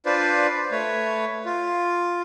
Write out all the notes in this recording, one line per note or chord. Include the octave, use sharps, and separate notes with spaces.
D4 F4 B4 C5 D5
A3 B4 C#5
F4